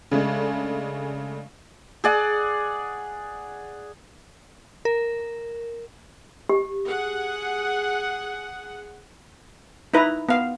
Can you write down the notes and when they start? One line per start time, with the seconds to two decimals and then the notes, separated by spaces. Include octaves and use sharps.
0.11 C#3 G#3 A3 D4
2.04 G#4 D5 F#5
4.85 A#4
6.49 G4
6.84 G#4 F#5
9.94 D#4 E4 B4 A#5
10.29 B3 F5